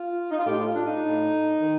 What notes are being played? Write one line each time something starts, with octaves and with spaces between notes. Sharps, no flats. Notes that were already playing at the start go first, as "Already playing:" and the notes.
Already playing: F4
D#4
F4
A2 G4
F4
D4
D#4
A2
D#3